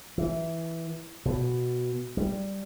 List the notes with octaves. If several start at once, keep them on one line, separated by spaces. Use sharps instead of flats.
E3
B2
G3